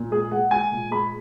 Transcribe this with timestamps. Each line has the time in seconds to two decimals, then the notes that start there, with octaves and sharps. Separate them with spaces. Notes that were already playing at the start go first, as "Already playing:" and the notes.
Already playing: A#2
0.11 G#3 G#4
0.31 G#3 F#5
0.51 G#3 G#5
0.72 A#2
0.91 G#3 B5